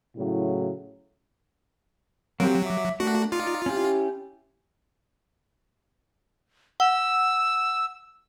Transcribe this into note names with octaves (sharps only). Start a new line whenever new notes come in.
A2 C#3 F#3 E4
F#3 A#3 C4 G4
E5 D6
A3 A#3 D4 F#4
D#4 F4 D5
C#4 E4 G4
F#5 E6